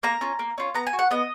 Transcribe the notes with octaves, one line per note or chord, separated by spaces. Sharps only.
A#3 A#5
C#4 F4
A#3
C#4 F4
B3 A#5
G#5
F#4
F#5
B3 D#5